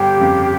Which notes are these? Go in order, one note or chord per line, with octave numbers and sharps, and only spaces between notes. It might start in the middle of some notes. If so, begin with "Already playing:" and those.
Already playing: G1 G4
F2 C#3